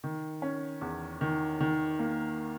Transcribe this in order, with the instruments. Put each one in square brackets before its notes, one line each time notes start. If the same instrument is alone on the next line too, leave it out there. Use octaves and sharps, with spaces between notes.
[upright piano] D#3
C#4
E2
D#3
D#3
A#3